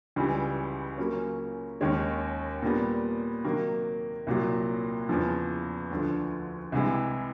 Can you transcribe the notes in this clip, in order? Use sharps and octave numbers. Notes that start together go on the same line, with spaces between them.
C#2 C#3 E3 G3
C#3 F#3 A#3 C#4
D#2 D#3 G#3 C#4
A#2 G3 B3
C3 D#3 F#3 A#3
C2 A#2 F#3
E2 C#3 F3
D2 D3 F3
C2 C3 E3 G#3